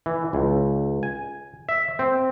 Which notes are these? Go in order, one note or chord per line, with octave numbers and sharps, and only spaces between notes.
E3
C#2
G#5
E5
C4